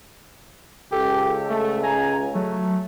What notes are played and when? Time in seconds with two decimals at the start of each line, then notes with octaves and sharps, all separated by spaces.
0.92 C#2 G4 A4
1.50 A3
1.83 G#5 A#5
2.35 F#3 A3